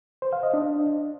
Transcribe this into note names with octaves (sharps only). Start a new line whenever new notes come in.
C5
F5
D#5
D4